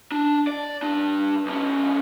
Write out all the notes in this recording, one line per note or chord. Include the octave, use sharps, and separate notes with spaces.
D4
D5
G2 D4
B1 C#4